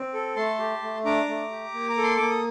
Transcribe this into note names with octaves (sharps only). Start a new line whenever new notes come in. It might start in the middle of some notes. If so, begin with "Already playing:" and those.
Already playing: C4
A4
A3 A5 C6
G4
A3
D4 A#5 D6
A3
G4
A#3
A#5
A4
C6
A#3 D6
D#6